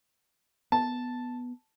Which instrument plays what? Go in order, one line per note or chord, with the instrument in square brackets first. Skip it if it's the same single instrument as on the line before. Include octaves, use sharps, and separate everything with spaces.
[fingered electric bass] B3 [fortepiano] A5